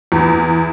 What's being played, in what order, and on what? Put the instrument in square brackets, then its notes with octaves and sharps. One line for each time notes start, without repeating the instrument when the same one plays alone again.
[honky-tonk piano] E2